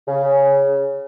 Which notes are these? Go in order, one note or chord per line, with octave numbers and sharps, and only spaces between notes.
C#3